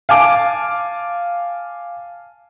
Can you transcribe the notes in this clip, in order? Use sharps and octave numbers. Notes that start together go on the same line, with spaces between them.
F5 G#5 A5 D6 D7